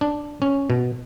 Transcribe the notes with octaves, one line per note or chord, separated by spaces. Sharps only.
D4
C#4
B2